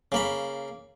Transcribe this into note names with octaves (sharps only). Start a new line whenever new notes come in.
C#3 A#3 B5